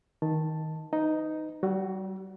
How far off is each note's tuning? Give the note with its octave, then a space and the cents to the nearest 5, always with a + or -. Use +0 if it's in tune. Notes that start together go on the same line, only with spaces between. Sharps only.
D#3 +15 A5 +0
D#4 +0 B4 +35 D#5 +0
G3 -35 F#4 +0